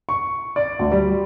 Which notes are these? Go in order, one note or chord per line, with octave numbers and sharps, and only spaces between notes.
C#6
D5
D2
G3